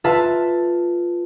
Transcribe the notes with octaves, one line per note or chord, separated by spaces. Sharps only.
F4 A4 B4 E5 A5